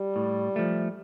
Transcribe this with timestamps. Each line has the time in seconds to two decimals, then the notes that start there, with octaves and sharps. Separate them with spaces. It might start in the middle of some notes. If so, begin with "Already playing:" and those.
Already playing: G3
0.16 A2
0.56 F3 A3